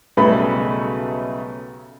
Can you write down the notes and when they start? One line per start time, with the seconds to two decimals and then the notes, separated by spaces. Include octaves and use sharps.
0.17 B1 C#3 G3 A3 B4 B5